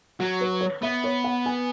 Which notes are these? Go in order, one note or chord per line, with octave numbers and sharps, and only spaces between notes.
F#3 F#4
B4
C#5
B3 E5
C#5
F#5
G#5